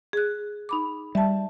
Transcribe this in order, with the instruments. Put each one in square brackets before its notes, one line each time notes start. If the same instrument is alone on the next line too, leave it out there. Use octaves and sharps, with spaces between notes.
[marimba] G#4 F#6
D#4 B5 D6
[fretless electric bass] G3 [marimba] E5 A5